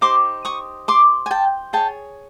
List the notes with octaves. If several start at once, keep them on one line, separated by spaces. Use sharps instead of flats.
D#4 G4 C5 C6 D6
C#6 D#6
C6 D6
G#5
G5 A5
G#4 C#5 G5 A5